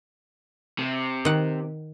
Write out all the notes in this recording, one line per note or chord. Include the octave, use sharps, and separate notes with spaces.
C3
D#3 F#5